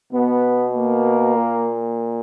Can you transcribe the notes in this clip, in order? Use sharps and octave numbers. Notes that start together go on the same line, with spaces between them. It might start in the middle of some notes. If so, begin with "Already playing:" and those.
B2 B3
A#3
A#2